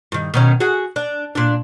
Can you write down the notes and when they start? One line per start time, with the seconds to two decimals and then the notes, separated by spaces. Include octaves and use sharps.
0.12 G2 D#3
0.34 B2 D#3 C#4
0.60 F#4 G#4
0.96 D4
1.35 A#2 D4